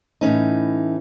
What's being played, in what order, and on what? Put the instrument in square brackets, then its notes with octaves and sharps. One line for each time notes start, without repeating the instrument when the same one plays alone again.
[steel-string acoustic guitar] A2 E3 C#4 D#4